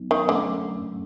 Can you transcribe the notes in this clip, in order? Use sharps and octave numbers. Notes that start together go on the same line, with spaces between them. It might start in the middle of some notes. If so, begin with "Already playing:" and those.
Already playing: F#3 B3 D#4
D#3
D3 F#3 A3 C#4